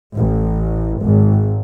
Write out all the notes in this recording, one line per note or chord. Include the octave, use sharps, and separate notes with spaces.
A1
G#1